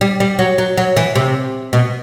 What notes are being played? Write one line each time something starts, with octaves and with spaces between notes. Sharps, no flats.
G3
G3
F#3
F#3
F#3
E3
C3
B2